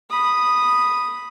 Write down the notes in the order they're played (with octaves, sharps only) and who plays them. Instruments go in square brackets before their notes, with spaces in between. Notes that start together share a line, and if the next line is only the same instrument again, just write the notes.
[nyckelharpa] B5 D#6